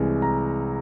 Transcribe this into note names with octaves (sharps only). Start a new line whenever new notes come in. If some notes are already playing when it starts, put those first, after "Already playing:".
Already playing: C2 C3 E3 G#3
A#5